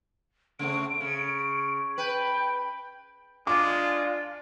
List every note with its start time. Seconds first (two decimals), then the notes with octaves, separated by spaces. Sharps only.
0.59 C#3 A3 C4 D7
1.00 C#3
1.98 B4 G5
3.47 G#3 D4 F4 D6